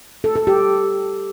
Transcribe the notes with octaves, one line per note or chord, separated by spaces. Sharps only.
A4
A4
G4